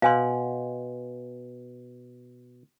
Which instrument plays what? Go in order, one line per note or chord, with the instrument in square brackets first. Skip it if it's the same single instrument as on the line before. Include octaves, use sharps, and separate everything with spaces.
[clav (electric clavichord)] B2 [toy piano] F5 G#5 C6